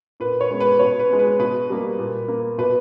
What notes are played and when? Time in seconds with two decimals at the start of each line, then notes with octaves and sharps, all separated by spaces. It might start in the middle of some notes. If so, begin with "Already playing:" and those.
0.20 A#2 B4
0.41 C#5
0.51 G#3 B3
0.60 B4
0.79 B2 C#5
0.99 B4
1.09 G#3 B3
1.19 B4
1.39 B2 B4
1.69 G3 A#3
1.99 A#2
2.28 A#3
2.58 B2 B4